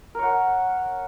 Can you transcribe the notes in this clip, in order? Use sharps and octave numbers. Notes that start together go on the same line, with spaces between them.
A#4 C#5 F#5